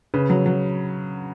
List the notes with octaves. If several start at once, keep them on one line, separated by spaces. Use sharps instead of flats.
C#3 B4
F#3
F#3